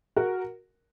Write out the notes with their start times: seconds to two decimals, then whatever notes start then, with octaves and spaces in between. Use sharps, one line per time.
0.16 F#4 A#4